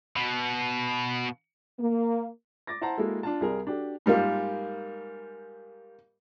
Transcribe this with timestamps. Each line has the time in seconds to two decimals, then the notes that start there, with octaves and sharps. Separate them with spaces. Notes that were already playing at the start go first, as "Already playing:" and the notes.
0.16 B2
1.79 A#3
2.67 D6 A6 A#6
2.81 E4 C5 F#5 A5 A#5
2.98 G#3 A#3 E4 F#4 A4
3.23 D4 F4 A5
3.41 C2 G3 G#4 A#4
3.67 D4 F#4 G4 A4
4.06 G#2 G3 A#3 F4